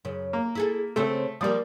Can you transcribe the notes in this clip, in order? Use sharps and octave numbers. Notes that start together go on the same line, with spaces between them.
F#2 C#3
A#3
E4 G#4 A4
C#3 A3 C4 A4 C5
F3 G3 A#3 D5 D#6